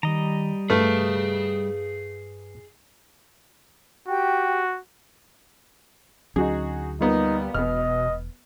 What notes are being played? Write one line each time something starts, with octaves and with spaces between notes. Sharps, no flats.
D#3 G3 D#5 A#5
G2 A3 G#4 B4 F5 F6
F#4 G4 G5
D2 F#3 C#4 D#4 F#4 G#4
G3 A#3 B3 D#4 F4
E1 B2 B3 D#5 F6